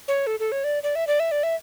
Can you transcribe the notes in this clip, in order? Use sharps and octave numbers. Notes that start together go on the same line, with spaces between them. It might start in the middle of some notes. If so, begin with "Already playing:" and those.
C#5
A4
A4
C#5
D5
D5
E5
D5
E5
D5
E5